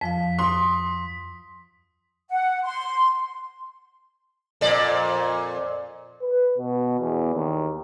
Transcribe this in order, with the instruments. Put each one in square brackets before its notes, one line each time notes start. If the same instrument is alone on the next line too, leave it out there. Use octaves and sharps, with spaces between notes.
[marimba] F2 F3 F5 [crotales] B6
[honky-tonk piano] C6 [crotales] D#6
[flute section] F#5
C6
[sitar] F2 A#2 D5
[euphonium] B4
B2
E2
D#2